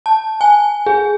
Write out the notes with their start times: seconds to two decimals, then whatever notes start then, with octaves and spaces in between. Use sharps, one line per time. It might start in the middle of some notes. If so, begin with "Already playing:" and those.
0.06 A5
0.41 G#5
0.86 G#4